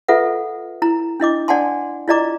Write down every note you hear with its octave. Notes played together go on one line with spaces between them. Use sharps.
F4 A4 B4 E5 F#5
E4 A#5
D4 E4 D#5 D6
D4 D5 F#5 G#5 A5 C6
E4 F4 D5 D#5 A#5 D6